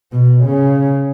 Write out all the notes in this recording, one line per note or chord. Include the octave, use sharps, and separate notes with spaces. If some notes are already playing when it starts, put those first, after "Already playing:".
B2
C#3